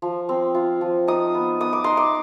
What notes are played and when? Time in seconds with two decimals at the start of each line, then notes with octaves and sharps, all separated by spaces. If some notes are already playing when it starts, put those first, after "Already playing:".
0.02 F3
0.29 C4
0.55 F4
0.81 F3
1.07 D#4 D#6
1.34 B3
1.60 B3 D#6
1.73 D6
1.84 D#4 C6
1.97 D6